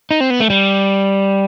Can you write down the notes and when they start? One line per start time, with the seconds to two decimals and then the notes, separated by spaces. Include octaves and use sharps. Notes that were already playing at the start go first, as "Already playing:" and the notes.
0.11 D#4
0.20 C4
0.30 B3
0.40 A3
0.50 G3